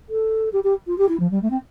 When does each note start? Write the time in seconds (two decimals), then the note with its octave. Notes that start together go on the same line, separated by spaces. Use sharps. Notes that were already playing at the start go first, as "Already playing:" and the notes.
0.09 A4
0.53 G4
0.63 G4
0.86 F4
0.98 G4
1.08 E4
1.19 F3
1.31 G3
1.42 A3
1.50 C4